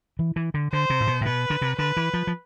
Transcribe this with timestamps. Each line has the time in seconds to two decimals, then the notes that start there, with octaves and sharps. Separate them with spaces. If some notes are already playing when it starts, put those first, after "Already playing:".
0.19 E3
0.36 E3
0.54 D3
0.73 D3 C5
0.90 C3
1.00 A2
1.07 B2
1.21 A2
1.25 B2 B4
1.50 D3
1.62 C3
1.79 D3 B4
1.97 E3
2.14 F3
2.27 F3